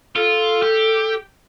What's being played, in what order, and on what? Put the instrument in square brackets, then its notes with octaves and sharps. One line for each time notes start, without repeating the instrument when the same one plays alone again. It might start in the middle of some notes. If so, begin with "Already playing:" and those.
[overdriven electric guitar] F4 [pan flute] A4
[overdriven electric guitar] G4